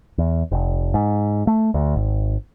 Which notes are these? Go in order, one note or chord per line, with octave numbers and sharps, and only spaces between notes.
E2
F1
G#2
A3
D2
G#1